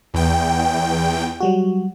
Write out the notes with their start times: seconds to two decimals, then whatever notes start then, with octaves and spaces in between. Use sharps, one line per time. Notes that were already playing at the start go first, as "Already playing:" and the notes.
0.14 E2 G5
1.41 F#3 G3 F#4